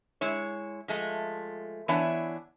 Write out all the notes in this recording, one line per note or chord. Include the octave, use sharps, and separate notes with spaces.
G#3 E4 C#5
F3 G#3 A3
E3 B3 D4 E4 C#5 G#5